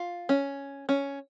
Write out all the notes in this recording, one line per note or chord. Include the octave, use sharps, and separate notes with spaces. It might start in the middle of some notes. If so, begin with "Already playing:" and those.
Already playing: F4
C#4
C#4